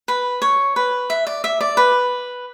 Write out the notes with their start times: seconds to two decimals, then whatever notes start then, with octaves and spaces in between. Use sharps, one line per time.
0.08 B4
0.42 C#5
0.76 B4
1.10 E5
1.27 D5
1.44 E5
1.61 D5
1.77 B4